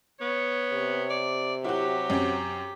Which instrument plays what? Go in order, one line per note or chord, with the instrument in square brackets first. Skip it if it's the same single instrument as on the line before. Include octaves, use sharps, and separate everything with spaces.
[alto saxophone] B3 [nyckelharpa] C#5
[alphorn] C3
[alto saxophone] D5
[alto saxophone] F#3 [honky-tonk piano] E4 F#4 [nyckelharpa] G4
[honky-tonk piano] F#2 C4